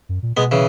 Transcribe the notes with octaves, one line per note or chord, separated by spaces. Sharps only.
F#2
A#2
B2 G#3 B3
C#3 E3